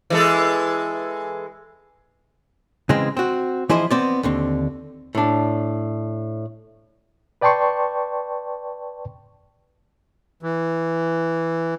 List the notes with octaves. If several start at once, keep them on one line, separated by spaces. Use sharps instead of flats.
E3 G#3 A4
C#3 E3 G#3 C4
C4 F#4
E3 F3 E4 G#4 C5 D#5
B3 C4 D5
D#2 D3 C4
A2 D4
B4 D5 G5 A5 C6 C#6
E3